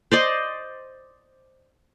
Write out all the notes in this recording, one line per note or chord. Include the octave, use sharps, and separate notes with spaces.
C5 D5 D#5